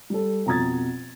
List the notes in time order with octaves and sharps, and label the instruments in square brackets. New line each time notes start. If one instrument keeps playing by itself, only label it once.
[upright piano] G3 A4
F2 B2 A#5 D#6 G#6 A6